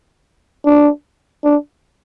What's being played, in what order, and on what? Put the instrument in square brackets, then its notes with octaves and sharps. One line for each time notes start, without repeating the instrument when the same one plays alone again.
[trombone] D4
D4